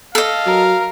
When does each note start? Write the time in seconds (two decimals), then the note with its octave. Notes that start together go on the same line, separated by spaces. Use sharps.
0.15 A4 D#5 F5
0.46 F#3 A#4